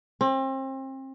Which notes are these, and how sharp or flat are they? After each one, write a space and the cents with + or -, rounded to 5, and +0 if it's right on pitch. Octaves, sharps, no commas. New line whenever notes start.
C4 +35